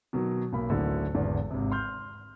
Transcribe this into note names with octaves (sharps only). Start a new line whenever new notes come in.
B2 D#3 F#3
B1 A#3 B5
A1 D2 D3 D#3 F#3
G#1 E2 D3 E3
G#1 C3
C6 F6 G6